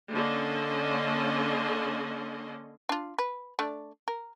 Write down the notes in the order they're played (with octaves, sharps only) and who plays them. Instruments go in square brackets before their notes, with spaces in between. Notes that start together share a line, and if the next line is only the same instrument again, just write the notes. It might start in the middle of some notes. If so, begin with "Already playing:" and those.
[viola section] D3 A#3 C#4 D#5 C6
[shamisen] D4 F4
B4
A3 D4 D5
A#4